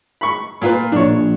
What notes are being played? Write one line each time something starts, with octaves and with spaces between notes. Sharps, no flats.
B5 C#6
A#2 F4 B4
A#1 D4 C#5